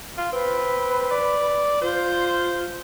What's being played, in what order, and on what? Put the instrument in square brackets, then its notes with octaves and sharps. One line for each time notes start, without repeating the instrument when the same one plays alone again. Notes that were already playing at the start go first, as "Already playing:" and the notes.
[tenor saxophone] F4
[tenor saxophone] C4 [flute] B4
[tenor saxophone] D5
[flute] F4 [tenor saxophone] C5